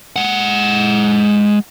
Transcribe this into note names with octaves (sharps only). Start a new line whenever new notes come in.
G#3 F#5